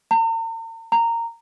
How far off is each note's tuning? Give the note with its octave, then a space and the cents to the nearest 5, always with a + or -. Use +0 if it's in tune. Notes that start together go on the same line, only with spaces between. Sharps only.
A#5 -45
A#5 -15